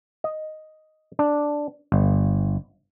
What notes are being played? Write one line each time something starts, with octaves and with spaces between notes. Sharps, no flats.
D#5
D4
G1